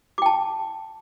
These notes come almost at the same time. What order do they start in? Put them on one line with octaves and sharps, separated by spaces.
D6 G5 A5